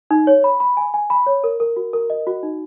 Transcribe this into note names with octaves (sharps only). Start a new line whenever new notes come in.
D#4
C#5
B5
B5
G#5
G#5
B5
C#5
A#4
A#4
F#4
A#4
D#5
F#4
D#4